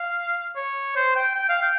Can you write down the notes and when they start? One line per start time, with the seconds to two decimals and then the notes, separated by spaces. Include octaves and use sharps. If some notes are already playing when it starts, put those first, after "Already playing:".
Already playing: F5
0.56 C#5
0.96 C5
1.15 G5
1.35 G5
1.49 F5
1.62 G5